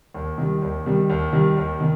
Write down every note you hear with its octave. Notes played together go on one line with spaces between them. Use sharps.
D#2
D#3 G3
D#2
D#3 G3
D#2
D#3 G3
D#2
D#3